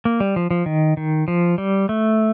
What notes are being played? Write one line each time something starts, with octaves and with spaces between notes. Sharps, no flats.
A#3
G3
F3
F3
D#3
D#3
F3
G3
A3